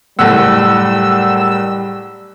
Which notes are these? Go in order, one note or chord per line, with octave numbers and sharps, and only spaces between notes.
F#1 A2 G3 A3 F#5 E6